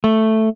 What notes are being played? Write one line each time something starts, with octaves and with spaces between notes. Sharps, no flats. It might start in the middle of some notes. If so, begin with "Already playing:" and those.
A3